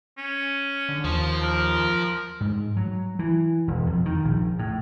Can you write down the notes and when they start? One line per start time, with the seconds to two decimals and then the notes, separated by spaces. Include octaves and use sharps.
0.18 C#4
0.89 D3
1.04 D#2 F3
1.42 A#4
2.41 G#2
2.77 F#3
3.19 E3
3.68 E1
3.86 F2
4.06 D#3
4.25 A#1
4.59 A2